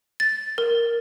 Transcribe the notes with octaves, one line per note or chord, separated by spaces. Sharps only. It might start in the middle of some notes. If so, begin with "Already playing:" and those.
A6
A#4